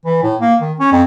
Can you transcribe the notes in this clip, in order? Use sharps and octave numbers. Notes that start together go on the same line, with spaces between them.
E3
A2
A#3
D#3
C#4
F2